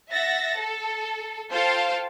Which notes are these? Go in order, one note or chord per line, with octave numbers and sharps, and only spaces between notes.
E5 F#5 A6 A#6
A4
F4 A4 C5 F5 G5 A5